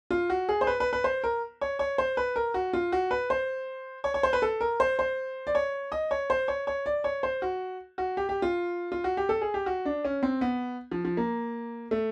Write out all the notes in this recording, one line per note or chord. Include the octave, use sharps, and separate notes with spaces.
F4
F#4
G#4
C5
B4
B4
B4
C5
A#4
C#5
C#5
C5
B4
A#4
F#4
F4
F#4
B4
C5
C#5
C#5
C5
B4
A4
A#4
C5
C5
D5
C#5
D#5
C#5
C5
C#5
C#5
D5
C#5
C5
F#4
F#4
G4
G4
F4
F4
F#4
G4
A4
G#4
G4
F#4
D4
C#4
C4
B3
F3
F3
A#3
A3